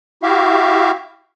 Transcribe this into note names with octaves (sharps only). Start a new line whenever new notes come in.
E4 F#4 G4 E5 F5